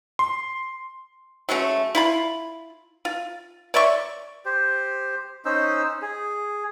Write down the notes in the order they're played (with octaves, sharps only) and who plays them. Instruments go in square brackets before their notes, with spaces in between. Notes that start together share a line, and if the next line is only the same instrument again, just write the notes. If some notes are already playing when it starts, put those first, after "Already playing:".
[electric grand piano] C6
[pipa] F#3 G#3 A3 C#4
E4 F4 B5
F4
C#5 D5 E5 C#6
[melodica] G4 C5
C#4 D#4 C5 E6
G#4